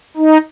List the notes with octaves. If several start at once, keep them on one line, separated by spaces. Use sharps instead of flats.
D#4